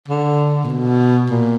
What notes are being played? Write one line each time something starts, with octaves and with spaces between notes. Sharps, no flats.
D3
A#2
B2
A#2